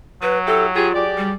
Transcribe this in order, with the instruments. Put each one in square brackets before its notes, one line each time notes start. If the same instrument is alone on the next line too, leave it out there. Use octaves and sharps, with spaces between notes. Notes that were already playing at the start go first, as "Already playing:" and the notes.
[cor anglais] F#3 [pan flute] B4
[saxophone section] E4 G4 [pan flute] A4
[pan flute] F4 [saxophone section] G4 G#4
[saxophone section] F#3 G#4 D5 [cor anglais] G4
[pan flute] G3